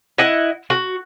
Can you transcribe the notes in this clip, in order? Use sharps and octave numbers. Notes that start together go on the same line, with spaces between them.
E4 D#5 F#5
F#4